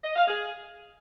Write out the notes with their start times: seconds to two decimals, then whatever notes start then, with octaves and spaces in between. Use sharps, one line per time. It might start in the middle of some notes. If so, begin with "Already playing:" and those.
0.04 D#5
0.16 F5
0.28 G#4